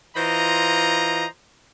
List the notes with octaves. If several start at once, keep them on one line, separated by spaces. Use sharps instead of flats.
E3 F4 C5 D#5 A#5